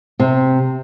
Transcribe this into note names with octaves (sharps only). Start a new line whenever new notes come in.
C3